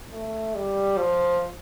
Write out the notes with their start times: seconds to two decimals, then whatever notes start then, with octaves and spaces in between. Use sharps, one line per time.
0.12 A3
0.55 G3
0.98 F3